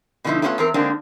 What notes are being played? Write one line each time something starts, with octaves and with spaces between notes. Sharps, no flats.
B2 D3 F3 F#3 D#4 E4
A3 B3 C#4 F4 C#5 F#5
E2 C4 A#4
D3 G#3 A#3 C4 D4 D#4